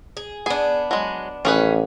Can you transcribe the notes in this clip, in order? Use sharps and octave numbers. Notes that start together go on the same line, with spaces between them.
G#4
B3 D4 G#4
F#3 G#3
A1 D#3 C#4 G#4 B4